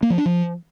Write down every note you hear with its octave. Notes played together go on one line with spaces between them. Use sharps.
A#3
F3
D4
F3